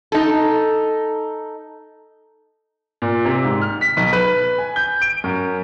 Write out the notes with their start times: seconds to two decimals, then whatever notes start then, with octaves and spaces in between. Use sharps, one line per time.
0.12 D#4 A4
3.02 A#2
3.25 C3
3.44 G#2
3.61 F6
3.81 B6
3.97 B1
4.13 B4
4.58 G#5
4.76 G6
5.02 D7
5.24 F#2